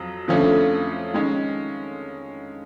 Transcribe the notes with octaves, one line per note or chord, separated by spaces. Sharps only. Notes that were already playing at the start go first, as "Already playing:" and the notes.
Already playing: F2 F#3
F2 D3 F3 A3 C#4
D#3 G#3 C#4